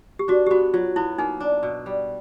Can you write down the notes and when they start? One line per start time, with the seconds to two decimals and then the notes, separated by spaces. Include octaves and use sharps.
0.19 G4
0.28 D4 F#4
0.47 G4
0.50 B3 F#4
0.74 F#3 F4
0.96 B3 E4
1.18 A#3 D#4
1.40 D4
1.63 B2
1.86 G3